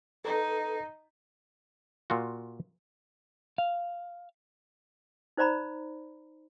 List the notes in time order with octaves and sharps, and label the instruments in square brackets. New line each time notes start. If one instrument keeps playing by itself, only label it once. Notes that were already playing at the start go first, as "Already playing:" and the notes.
[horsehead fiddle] D#4 [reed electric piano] A4 B4
[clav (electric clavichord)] A#2 F4 F#4
[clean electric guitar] F5
[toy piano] D#4 C5 D5 A#5 B5